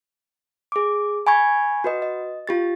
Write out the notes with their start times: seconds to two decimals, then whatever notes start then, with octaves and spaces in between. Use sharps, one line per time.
0.72 G#4 D6
1.27 G#5 B5 C#6 G#6
1.84 F#4 B4 D#5
2.02 D#5
2.47 F4 G4 A6